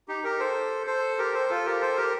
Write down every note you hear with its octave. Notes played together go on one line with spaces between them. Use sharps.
D#4 G4
G4 A#4
A4 C5
A4 C5
G4 A#4
A4 C5
F4 A4
G4 A#4
A4 C5
G4 A#4